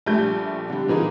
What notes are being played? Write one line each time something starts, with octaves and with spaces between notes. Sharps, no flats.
A#1 G3 A3 G6
D3 G3
A#2 E3 D#4 G#4